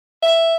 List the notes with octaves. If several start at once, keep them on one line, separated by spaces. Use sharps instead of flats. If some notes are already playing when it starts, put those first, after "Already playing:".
E5